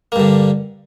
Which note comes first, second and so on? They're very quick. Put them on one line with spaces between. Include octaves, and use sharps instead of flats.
A#3 G2 D3